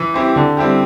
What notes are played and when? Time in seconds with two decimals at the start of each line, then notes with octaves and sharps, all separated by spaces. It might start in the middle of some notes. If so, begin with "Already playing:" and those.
Already playing: E3
0.14 C4 E4 G4
0.36 D3
0.57 G3 C4 E4 G4